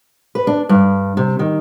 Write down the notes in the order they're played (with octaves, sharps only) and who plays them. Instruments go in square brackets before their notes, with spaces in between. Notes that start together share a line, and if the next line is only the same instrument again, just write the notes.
[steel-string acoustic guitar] B4
D4
G2
C3
D#3